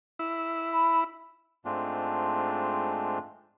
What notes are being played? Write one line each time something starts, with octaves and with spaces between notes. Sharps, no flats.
E4
B5
G#2 G#3 A3 C4 D4 F4